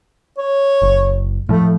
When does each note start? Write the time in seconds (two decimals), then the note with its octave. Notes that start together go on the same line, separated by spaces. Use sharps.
0.38 C#5
0.82 F#1
1.49 A2 F3 A3